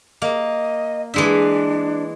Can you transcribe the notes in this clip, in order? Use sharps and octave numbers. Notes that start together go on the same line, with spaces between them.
A#3 D#5
E3 G#3 D4 E5